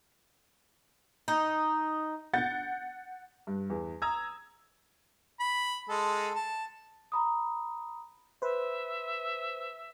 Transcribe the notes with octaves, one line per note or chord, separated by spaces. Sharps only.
D#4
F#5 G6 A6
G2
E2
A#5 D#6 E6 G#6
B5
G#3 A4
A5
A#5 B5 D#6
B4 C5 E5